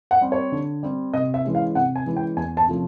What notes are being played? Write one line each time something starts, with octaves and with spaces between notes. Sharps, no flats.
F#5
G3 C4
C#5
D3
G3 C4
C3 D#5
E5
E3 G#3 C#4
F5
C3 F#5
G#5
E3 G#3 C#4
G5
E2 G#5
A5
C3 F3 A3 C#4